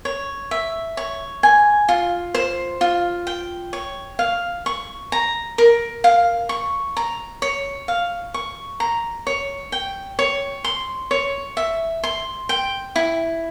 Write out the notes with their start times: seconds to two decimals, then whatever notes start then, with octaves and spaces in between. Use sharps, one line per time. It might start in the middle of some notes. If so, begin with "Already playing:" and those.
0.05 C#5
0.51 E5
0.97 C#5
1.43 G#5
1.88 F4
2.34 C5
2.81 F4
3.27 G5
3.73 C#5
4.19 F5
4.66 C#6
5.12 A#5
5.58 A#4
6.04 F5
6.49 C#6
6.97 A#5
7.42 C#5
7.88 F5
8.34 C#6
8.80 A#5
9.27 C#5
9.72 G5
10.19 C#5
10.64 C6
11.11 C#5
11.57 E5
12.03 C6
12.49 G5
12.96 E4